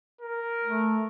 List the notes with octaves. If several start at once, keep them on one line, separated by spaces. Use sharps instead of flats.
A#4
A3